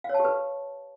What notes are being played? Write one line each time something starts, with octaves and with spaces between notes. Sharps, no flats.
F5
C#5
A5
G4
B4